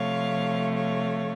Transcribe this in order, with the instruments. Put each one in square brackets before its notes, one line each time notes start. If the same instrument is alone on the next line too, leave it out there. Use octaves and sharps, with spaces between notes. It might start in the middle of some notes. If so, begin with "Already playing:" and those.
Already playing: [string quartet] C3 F3 A3 C#5 F5
C#5 F5